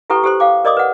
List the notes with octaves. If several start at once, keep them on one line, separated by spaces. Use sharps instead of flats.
E4 G4 A4 B4 G5 C#6
G4 A4 C5 C6
F5 G5 D6
A#4 D5 D#5 C6 D6 D#6
B4 F#5